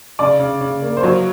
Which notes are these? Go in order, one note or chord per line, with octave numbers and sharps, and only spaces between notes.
C#3 D5
C#3
C#3
A#3
C5
F#3 C#5